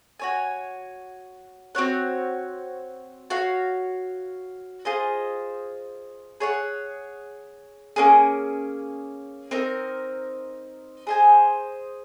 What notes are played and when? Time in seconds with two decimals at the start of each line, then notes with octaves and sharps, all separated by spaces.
0.20 F#4 C#5 G#5
1.75 C4 F#4 C#5 F#5
3.30 F#4 C#5 F5
4.85 F4 G#4 C5 D#5
6.40 G#4 C#5 F#5
7.96 A#3 C#4 G#4
9.51 C4 D#4 A#4
11.07 G#4 C5 D#5 G#5